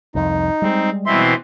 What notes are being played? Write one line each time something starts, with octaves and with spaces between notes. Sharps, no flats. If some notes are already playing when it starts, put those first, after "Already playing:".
C2 F2 D#4
G3 G#3 C4
B2 E3 C4 E5 C6